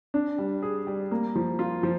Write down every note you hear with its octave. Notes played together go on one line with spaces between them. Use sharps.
D4
G3
G#4
G3
A#3
F3
F4
F3